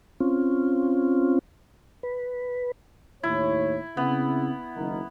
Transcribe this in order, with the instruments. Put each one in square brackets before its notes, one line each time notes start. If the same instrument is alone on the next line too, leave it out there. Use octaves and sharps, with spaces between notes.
[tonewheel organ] C4 C#4 F4
B4
[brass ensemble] D#2 A2 C#5 [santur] E4
[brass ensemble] C#3 C4 E4 [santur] B3
[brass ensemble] F#1 D#3